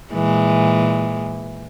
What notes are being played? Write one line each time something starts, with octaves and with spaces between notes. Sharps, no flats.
A#2 E3 G#3